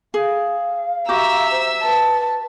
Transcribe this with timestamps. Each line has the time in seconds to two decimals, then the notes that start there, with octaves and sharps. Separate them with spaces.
0.14 G#4 F5
1.09 F#4 G4 E5 A#5 E6
1.51 C5
1.82 B4 A5